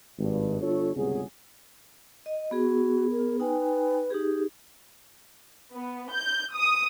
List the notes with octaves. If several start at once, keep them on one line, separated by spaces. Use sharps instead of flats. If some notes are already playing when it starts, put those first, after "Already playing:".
G#1 G2
G1 D3 F4 A4 C#5
G1 C#2 C3 F#3 G#4
D#5
B3 F#4 G#4
A#4
D#4 B4 G5 G#5
D#4 G4 G#4
B3
G6
D#6